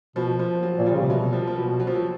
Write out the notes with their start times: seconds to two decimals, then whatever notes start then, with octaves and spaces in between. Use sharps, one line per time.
0.16 B2 F3
0.39 F3
0.63 F#3
0.79 A#2
0.86 G3
0.92 C#3
1.00 C3
1.10 B2 F#3
1.33 F3
1.47 F3
1.56 B2 F#3
1.80 F#3
1.87 F3
1.95 F#3